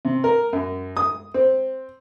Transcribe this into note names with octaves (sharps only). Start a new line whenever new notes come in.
C3
A#4
F#2
D#6
C4